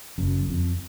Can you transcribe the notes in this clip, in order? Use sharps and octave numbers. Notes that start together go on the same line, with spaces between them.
F#1 F#2
F2